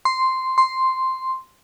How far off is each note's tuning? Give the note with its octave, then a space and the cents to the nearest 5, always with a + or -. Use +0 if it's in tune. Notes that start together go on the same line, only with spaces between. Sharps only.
C6 -5
C6 +0